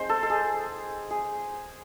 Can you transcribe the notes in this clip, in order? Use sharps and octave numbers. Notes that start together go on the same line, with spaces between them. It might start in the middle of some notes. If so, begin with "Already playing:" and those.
Already playing: G#3 C4 D#4 C5
A4
A4
G#4
G#4